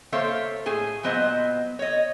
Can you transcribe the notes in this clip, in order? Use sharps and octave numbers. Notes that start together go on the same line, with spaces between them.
A#3 A4 C5 C#5 E5 F5
A2 G#4 G#5
A#2 F#3 B3 C5 D#5
C#5 D#5